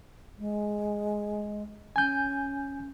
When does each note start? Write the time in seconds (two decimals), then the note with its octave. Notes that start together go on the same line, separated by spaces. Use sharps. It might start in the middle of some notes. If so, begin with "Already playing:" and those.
0.39 G#3
1.96 C#4 G#5 G6